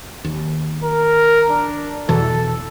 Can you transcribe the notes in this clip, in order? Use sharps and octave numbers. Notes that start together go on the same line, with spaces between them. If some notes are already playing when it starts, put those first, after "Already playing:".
D#2
A#4
D4
E2 B2 E3 A4